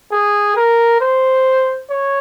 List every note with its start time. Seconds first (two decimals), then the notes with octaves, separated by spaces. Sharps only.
0.12 G#4
0.57 A#4
1.01 C5
1.90 C#5